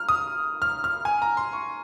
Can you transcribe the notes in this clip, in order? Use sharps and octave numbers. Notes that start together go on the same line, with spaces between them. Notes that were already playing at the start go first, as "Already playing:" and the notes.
Already playing: F6
D#6
F6
F6
G#5
A#5
C6
C#6